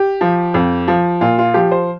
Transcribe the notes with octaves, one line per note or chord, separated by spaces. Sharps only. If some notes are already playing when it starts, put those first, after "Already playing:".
Already playing: G4
F3
F2
F3
A#2 F4
F4
F3 G4
C5